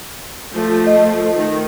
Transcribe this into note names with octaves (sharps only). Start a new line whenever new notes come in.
F3 A3
D#5
D#3